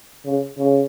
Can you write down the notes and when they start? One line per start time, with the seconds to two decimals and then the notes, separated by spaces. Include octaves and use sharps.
0.26 C#3
0.58 C#3